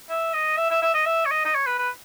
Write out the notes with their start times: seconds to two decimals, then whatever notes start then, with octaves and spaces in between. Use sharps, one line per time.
0.09 E5
0.33 D#5
0.57 E5
0.70 E5
0.82 E5
0.94 D#5
1.06 E5
1.26 C#5
1.31 D#5
1.45 D#5
1.55 C#5
1.66 B4
1.78 B4